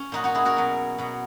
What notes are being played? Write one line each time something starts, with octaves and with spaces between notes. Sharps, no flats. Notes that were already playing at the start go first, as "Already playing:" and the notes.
Already playing: C#4
A#2 F#3 D#4 F#4
D#4 F#4
E4 G#4
F#4 A#4
B2 F#3
B2 F#3